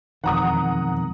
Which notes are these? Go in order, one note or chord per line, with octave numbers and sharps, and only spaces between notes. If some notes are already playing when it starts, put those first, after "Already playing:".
E1 F2 D#3 F#5 A#5 D#6